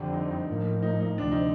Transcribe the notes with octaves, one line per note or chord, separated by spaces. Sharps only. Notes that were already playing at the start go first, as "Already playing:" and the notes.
Already playing: F2 D3 G3 C4 D4
D#4
D#4
A2 F3 A#3
D#4
D#4
D2 C3 F3 C4 D4
D#4